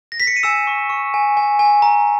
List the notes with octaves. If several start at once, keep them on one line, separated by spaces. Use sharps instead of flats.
A#6
B6
C#7
D#7
G#5 E6 E7
C#6
C#6
G#5
G#5
G#5
A#5